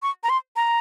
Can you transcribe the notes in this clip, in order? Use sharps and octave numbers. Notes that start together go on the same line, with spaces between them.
C#6
A#5
C6
A#5